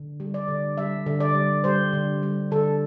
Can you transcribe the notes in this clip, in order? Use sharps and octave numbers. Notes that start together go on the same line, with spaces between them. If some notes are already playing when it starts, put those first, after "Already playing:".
Already playing: D3
G3
D5
D3
G3 E5
D3
D5
G3
G3 C5
D3
G3
D3 A4